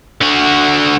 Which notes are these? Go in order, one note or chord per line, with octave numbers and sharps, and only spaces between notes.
D3 F#4